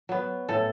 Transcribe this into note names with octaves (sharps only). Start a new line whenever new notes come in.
F#3 B3
A2 A4